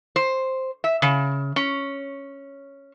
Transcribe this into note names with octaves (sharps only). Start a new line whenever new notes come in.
C5
E5
C#3
C#4